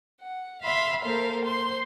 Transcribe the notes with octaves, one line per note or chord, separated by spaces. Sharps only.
F#5
E5 F5 B5 C6
A#3 A4 A#4 C5 F5
C5 C6